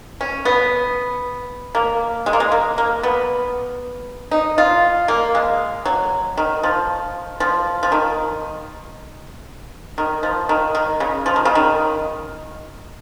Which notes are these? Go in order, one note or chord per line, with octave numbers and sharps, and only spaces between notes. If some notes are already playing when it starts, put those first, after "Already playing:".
C#4
B3
A#3
G#3
A#3
G#3
A#3
A#3
B3
D#4
F4
A#3
G#3
F#3
D#3
F3
F3
F3
D#3
D#3
F3
D#3
D#3
C#3
F3
D#3
C#3
D#3